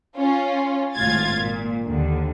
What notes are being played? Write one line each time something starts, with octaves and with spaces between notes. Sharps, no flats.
C#4 F4
G#1 A2 F4 G#6 A6
A#2
D#2 D3